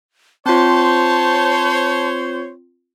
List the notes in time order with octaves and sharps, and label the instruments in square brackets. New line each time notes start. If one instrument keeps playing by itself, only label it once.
[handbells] C4 F4 [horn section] C5 C#5 [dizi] A5